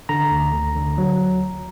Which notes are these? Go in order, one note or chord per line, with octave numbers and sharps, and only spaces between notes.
D3 A#5
D2
D2
D3
F#3